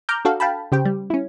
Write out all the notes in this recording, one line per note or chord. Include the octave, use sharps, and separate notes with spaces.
A#5 D6 F6 G6
D4 F#4 A4 F5
F5 G5 A5 B5
C#3 G4 C5 G5
G3
C#4 E4